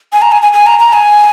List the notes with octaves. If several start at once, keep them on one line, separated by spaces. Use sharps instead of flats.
G#5
A#5
G#5
G#5
G#5
A#5
A#5
G#5